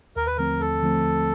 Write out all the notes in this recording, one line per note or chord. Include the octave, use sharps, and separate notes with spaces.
D#2 A#4
B4
D3 F3 A3 C4 A#4
D#2 A4
D3 F3 A3 C4
D#2